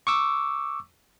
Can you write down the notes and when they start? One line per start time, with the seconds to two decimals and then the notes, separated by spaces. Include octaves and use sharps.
0.07 C#6 D6 E6